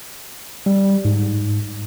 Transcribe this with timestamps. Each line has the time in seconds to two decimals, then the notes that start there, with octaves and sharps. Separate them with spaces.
0.66 G3
1.05 G#2